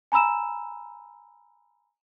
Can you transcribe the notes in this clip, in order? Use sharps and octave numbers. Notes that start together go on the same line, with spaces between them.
G#5 A#5 B5 E6 E7